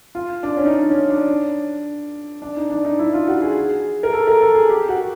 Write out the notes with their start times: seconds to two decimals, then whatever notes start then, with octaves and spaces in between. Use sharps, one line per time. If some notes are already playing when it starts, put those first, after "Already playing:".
0.15 F4
0.43 D4
0.57 C#4
0.66 D#4
0.71 D4
0.90 C#4
1.10 D4
2.42 D4
2.57 D#4
2.70 D4
2.85 D#4
2.99 E4
3.13 F4
3.27 F#4
3.42 G#4
4.03 A#4
4.13 A4
4.27 A#4
4.41 A4
4.55 G#4
4.69 G4
4.88 F#4